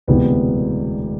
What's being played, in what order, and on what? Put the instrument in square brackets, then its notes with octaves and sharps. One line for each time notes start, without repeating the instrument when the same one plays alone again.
[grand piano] E1 D2 C3 E3 B3